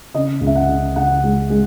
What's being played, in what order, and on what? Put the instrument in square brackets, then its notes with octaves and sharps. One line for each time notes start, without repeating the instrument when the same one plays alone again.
[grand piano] C#3 D#5
C#2
E5
F#5
C#3
C#3 F#5
G#3
G#3